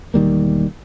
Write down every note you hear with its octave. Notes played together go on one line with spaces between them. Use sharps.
E1 D#3 G3 A#3